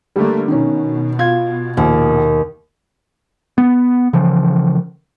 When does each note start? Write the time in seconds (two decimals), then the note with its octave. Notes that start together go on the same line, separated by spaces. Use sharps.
0.16 D3 G3 A3 A#3
0.48 B2 D#3 C#4
1.19 F4 G#6
1.77 A#1 D#2
3.58 B3
4.13 C#3 E3 F3